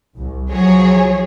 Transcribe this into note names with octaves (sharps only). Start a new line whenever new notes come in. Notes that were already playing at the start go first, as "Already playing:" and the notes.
C2
C2 F3 F#3 G#4 C#5